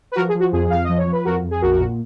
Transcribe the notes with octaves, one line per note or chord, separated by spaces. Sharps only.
B4
F3 F#4 A#4
G#4
F3
F#4
F2 G#4
F2 F5
F3 D#5
C#5
F3
B4
F2 F#4 A#4
F2
G#4
A#1 F#4 A#4
A#2